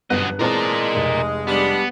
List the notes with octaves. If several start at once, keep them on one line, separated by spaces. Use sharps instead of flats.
G1 F#2 B3 D#5 F#6
E3 G#3 C4 A#4 D5 A5
F1
G3 B3 D4